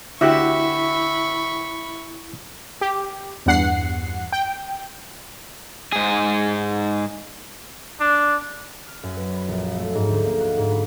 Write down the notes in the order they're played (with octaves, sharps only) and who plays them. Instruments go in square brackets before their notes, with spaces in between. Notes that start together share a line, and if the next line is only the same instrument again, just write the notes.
[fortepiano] D2 F#4 G4 [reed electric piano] E4 [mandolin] E5 [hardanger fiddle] B5 C#6
[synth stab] G4
E2 G2 F#5 C7
G5
[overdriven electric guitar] G#2 G#4
[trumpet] D4
[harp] F6
F#2
B4
B5
A#1
A3
G#2
D2
A#3
F#4
G#2
B5